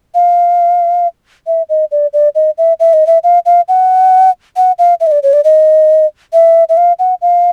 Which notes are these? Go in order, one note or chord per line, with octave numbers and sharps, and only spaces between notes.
F5
E5
D#5
D5
D5
D#5
E5
E5
D#5
E5
F5
F5
F#5
F#5
F5
E5
D#5
D5
C#5
D5
D#5
E5
E5
F5
F#5
F5